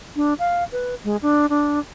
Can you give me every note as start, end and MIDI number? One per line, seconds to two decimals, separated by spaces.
0.16 0.34 62
0.39 0.64 77
0.72 0.95 71
1.04 1.16 56
1.22 1.46 62
1.49 1.79 62